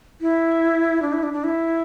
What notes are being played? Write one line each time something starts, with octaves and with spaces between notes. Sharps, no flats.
E4
D4
E4
D4
D4
E4